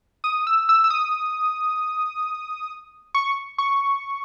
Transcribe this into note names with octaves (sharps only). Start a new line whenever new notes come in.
D#6
E6
E6
E6
D#6
C#6
C#6